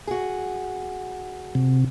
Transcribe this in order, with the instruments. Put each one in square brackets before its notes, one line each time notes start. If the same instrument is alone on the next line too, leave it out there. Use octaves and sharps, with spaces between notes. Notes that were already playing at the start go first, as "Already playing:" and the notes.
[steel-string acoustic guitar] F#4 G#4
[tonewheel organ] C3